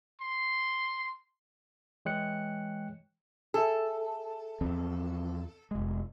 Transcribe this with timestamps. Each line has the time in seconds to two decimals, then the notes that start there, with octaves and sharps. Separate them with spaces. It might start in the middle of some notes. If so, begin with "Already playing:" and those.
0.20 C6
2.05 E3 G#3 C#5 G5 F#6 C#7
3.54 G#4 A4 E5
4.61 E2 F3 C4
5.71 F1 G#3